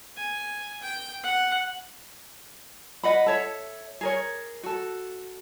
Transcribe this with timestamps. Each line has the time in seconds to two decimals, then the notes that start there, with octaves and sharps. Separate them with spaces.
0.17 G#5
0.82 G5
1.23 F#5
3.03 B4 D#5 F#5 B5
3.26 A4 C#5 E5
4.01 G#4 A#4 C#5
4.63 F#4 A4